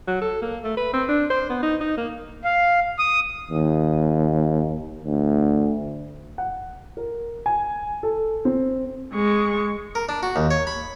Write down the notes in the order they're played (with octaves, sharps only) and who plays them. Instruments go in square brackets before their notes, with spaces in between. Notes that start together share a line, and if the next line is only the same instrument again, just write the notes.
[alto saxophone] F#3
A4
A#3
A3
B4
C4
D4
C5
B3
D#4
D#4
A#3
[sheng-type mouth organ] F5
D#6
[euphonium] D#2
D2
[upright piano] F#5
A#4
G#5
A4
C4
[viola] G#3 C#6
[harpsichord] A#4
D4
F#4
D#2
C#5
B5